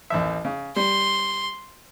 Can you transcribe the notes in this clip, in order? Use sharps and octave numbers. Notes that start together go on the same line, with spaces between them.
A1 D#2 E5
C#3
G3 C6